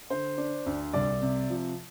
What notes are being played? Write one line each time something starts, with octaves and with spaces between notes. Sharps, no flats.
D3 C5
D4
D2
C2 D5
C3
F3